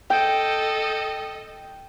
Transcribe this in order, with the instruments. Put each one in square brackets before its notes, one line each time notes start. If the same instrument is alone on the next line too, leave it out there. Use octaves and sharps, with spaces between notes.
[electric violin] A4 D#5 [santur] G5